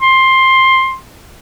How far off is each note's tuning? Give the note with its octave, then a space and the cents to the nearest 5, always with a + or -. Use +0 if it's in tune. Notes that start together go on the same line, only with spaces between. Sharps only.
C6 +15